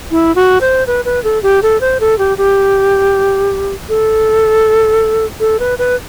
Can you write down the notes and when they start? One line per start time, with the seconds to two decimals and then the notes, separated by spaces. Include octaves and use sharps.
0.11 E4
0.35 F#4
0.61 C5
0.87 B4
1.05 B4
1.24 A4
1.43 G4
1.62 A4
1.81 C5
2.00 A4
2.18 G4
2.38 G4
3.89 A4
5.40 A4
5.59 B4
5.79 B4